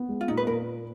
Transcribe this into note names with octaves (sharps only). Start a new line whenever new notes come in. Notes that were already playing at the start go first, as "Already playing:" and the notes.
Already playing: B3
G#3
F4
A#2 D#4
B4
A#2 A#4